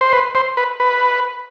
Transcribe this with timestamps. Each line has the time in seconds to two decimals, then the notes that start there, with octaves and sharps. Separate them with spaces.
0.01 C5
0.13 B4
0.35 C5
0.57 B4
0.80 B4